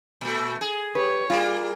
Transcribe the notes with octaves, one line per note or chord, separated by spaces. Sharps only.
A#2 A3
G#4
G4 B4 C#5
G3 A#3 F4 G#4